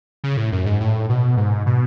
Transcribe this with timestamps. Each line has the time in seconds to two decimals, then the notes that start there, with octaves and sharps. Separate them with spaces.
0.24 C#3
0.37 A2
0.52 F#2
0.66 G#2
0.80 A2
1.09 B2
1.37 G#2
1.66 B2